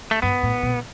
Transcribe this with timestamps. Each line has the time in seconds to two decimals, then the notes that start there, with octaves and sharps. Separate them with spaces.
0.11 A3
0.22 G2 B3
0.43 A2
0.63 B2